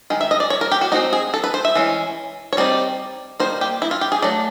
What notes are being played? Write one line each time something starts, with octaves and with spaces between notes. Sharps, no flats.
D#3 G#3
E5
D#5
D5
C#5
A#4
G4
F#4
G#3 C4 D#4 F#4
G#4
A4
B4
C5
E5
E3 G#3 C#4
C#5
G3 C4 D#4 D5
D#3 G3 A#3 C5
G4
E4
F4
G4
G#4
F#3 A3 D5